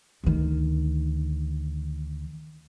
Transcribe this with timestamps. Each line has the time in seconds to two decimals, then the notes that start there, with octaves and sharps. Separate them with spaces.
0.24 D2 D#3